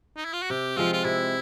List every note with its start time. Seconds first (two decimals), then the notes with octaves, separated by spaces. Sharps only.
0.16 D#4
0.25 E4
0.33 F4
0.42 F#4
0.50 C3 G4
0.77 F3 G#3 C4 F4
0.93 F4
1.04 C3 E4